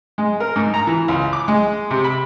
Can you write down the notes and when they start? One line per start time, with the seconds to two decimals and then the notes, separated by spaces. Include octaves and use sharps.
0.18 G#3
0.40 A#4
0.56 G#2
0.74 A#5
0.87 E3
1.08 C#2
1.33 D6
1.48 G#3
1.90 C3
2.04 B5